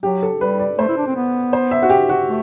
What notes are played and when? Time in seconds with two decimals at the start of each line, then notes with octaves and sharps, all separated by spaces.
0.03 F#3 G4
0.23 A4
0.40 G3 B4
0.60 D5
0.78 A3 C5
0.89 E4
0.98 D4
1.07 C4
1.16 B3
1.53 C5
1.71 E5
1.82 F#4
1.90 G4
2.09 F#4
2.27 A3